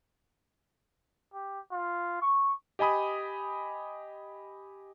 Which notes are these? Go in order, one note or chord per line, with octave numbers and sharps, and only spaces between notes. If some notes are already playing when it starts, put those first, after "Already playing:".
G4
F4
C#6
G4 D#5 G#5 B5 D#6